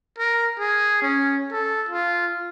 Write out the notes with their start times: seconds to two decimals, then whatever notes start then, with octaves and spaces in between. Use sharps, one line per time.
0.18 A#4
0.59 G#4
1.02 C#4
1.52 A4
1.89 F4